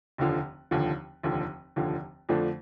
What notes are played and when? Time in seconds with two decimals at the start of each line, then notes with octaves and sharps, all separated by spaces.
0.18 F1 D#2 D3 F3
0.71 F1 D#2 D3 F3
1.23 F1 D#2 D3 F3
1.76 F1 D#2 D3 F3
2.29 F2 D3 F3 A3 D4